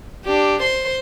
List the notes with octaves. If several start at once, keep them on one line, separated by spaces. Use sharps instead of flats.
D4 G4
C5 C6